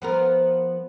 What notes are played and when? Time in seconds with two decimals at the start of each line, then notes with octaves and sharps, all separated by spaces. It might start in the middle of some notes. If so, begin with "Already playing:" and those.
0.02 F3 B3 A#4